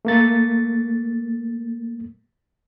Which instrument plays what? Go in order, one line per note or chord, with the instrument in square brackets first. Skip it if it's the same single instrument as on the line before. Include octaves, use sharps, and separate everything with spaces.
[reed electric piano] A3 A#3 A6